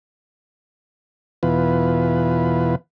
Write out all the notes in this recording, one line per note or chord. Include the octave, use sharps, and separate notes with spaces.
E2 B2 E3 F4 B4